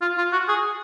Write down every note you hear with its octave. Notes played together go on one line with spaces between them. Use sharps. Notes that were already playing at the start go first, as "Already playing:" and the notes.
F4
F4
F#4
G#4